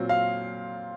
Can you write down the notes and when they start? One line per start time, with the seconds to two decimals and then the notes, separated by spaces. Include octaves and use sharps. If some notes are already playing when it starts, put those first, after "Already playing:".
Already playing: A#2 F#3 C4
0.09 F5